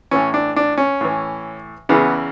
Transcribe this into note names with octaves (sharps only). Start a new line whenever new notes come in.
A2 E3 C#4
D4
D4
C#4
A2 E3
E2 C#3 E3 B3